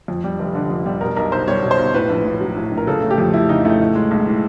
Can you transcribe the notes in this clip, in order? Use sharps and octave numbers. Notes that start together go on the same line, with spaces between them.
F2
G3
F1
D3
F2
G3
B2 A#4
B1 A#4
B1 C5
G3 C#5
B2
C5
B1
A2 B4
A#1
A#1
F#3
A2
A#1
A#4
C#3 A4
A3
G4
F2
E3 E4
C#3 D#4
A3 E4
A2
G#3
B1
E3